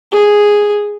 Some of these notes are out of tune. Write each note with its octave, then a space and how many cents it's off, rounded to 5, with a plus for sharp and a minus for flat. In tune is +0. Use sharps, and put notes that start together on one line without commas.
G#4 -5